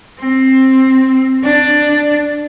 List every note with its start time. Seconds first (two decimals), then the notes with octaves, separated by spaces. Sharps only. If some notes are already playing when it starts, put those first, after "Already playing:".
0.20 C4
1.44 D4